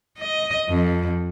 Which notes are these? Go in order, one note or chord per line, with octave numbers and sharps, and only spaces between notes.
D#5
F2